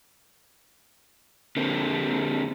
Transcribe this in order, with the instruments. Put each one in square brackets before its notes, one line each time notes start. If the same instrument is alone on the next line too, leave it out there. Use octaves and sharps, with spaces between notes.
[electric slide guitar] D3 A#3 C4